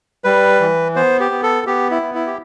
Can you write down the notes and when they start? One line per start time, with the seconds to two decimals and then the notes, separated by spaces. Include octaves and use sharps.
0.24 G3 B4
0.60 E3
0.96 B3 C5
1.20 G4
1.31 B3
1.43 A4
1.67 B3 G4
1.91 E4
2.02 B3
2.15 E4
2.27 G4